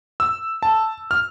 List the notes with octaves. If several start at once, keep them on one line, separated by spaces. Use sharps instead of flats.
E6
A5
F6